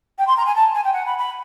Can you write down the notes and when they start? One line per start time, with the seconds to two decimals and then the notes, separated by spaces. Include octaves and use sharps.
0.18 G5
0.28 C6
0.37 A#5
0.46 G#5
0.56 A5
0.75 G#5
0.84 G5
0.93 F#5
1.06 B5
1.18 B5